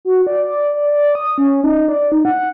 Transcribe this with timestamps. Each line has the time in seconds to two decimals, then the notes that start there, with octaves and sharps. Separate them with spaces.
0.05 F#4
0.27 D5
0.45 D5
0.74 D5
0.91 D5
1.15 D#6
1.38 C#4
1.64 D#4
1.88 D5
2.12 D#4
2.25 F#5